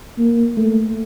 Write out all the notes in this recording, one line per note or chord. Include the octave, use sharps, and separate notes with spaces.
A#3
A3